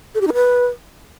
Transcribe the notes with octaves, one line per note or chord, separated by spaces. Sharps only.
A4
G4
D#4
B4